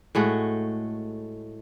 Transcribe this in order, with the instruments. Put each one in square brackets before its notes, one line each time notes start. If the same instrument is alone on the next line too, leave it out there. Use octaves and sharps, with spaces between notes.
[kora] A2 G#3 A3 F#4